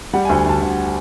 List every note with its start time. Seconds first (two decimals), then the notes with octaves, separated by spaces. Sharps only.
0.13 G3 F#5
0.25 G#5
0.29 D2
0.37 G#5
0.46 D2 A5
0.62 D2